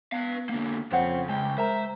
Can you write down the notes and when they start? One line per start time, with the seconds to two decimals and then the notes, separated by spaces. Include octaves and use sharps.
0.13 B3 B4 F5
0.49 D3 A#3
0.92 F2 C#3 C4 C5 C#5 F#5
1.29 C#2 G#3 G5 G#5
1.58 G#3 A#4 C5 E5 A#5